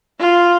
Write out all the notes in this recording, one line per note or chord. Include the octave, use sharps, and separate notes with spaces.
F4